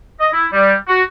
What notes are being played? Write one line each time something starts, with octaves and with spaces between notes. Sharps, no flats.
D#5
E4
G3
F#4